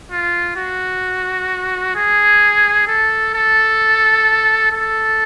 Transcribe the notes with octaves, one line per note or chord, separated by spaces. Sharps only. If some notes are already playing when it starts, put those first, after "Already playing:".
F4
F#4
G#4
A4
A4
A4